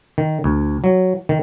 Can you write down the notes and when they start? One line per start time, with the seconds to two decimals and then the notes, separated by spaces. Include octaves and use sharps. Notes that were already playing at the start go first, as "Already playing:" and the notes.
0.18 D#3
0.44 D2
0.84 F#3
1.29 D#3